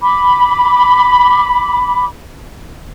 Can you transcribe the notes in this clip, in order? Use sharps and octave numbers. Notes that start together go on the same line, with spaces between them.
B5 D6